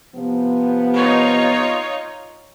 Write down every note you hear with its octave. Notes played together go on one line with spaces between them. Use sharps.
C3 F3 B3
D#4 F4 C#5